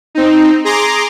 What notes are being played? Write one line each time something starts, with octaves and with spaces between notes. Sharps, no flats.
C4 D#4
G#4 A#5 C6 D6